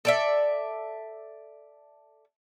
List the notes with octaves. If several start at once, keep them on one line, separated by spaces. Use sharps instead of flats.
A4 D5 E5